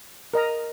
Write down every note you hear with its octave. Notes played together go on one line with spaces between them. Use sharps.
A#4 D#5 A#5